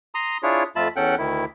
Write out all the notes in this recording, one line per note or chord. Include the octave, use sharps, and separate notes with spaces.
A#5 C6 D#6
D4 E4 F4 G#4 C#5
F2 A3 F4 E5 A5 B5
E2 C#4 A4 F#5 G5 F#6
D2 D#3 E4